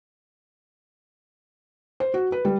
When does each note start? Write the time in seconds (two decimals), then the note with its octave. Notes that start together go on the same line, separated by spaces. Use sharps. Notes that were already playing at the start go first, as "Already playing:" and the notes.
2.00 C5
2.14 F#4
2.32 B4
2.45 G3